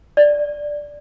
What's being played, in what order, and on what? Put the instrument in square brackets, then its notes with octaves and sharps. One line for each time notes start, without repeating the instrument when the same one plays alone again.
[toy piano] D5